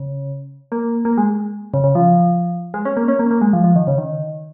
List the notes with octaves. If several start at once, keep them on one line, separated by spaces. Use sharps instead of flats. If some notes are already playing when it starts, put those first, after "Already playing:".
Already playing: C#3
A#3
A#3
G#3
C#3
C#3
F3
G#3
C#4
A#3
C#4
A#3
A#3
G#3
F3
F3
D#3
C#3
D#3